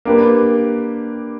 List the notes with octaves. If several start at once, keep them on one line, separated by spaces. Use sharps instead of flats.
A#3 D4 G4 B4